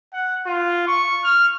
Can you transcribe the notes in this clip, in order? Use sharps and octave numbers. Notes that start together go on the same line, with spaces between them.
F#5
F4
C#6
F6